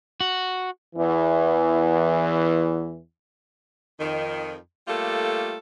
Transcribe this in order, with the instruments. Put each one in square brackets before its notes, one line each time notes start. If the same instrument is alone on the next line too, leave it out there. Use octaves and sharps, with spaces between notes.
[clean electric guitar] F#4
[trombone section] E2 E3
[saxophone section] F2 D#3
G3 A3 A#3 F4 A4